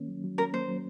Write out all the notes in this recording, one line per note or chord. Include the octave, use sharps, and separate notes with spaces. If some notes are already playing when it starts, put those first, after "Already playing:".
Already playing: D#3 A#3 C#4
F#3
F#3
C#4 A#4
A#3 C5
F#3